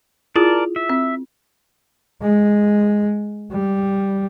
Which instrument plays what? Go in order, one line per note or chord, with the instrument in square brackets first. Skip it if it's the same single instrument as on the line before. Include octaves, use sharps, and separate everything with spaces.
[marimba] E4 F4 G#4 [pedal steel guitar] A#4 D5 A5
[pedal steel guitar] E5
[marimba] C4
[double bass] G#3
G3